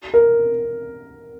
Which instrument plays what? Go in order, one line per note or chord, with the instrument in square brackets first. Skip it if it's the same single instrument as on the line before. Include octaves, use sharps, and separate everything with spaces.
[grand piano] A#4